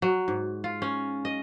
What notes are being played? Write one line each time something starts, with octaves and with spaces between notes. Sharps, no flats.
F#3
G#2
F4
C#4
D#5